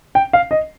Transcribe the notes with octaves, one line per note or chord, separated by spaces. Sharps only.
G5
F5
D#5